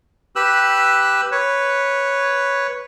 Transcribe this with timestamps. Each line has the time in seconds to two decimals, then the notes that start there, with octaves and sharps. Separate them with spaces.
0.36 G4 B4 E6 F#6
1.32 B4 C#5